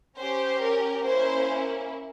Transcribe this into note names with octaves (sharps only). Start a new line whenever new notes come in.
C#4 G4 C5
A#4
A#3 C#4 E4 C5